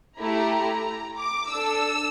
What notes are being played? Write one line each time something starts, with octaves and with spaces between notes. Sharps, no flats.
A3 E4 G4 A#5
D6
D4 A4 E6